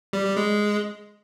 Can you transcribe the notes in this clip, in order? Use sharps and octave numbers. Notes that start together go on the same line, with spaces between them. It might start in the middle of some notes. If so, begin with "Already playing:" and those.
G3
G3
G#3